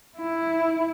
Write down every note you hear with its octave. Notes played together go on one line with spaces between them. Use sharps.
E4